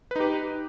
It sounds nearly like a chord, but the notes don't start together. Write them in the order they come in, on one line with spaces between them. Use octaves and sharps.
B4 D#4 G4